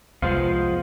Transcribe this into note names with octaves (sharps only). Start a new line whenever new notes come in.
C2 F2 F3 G#3 B3 F4 C5 F5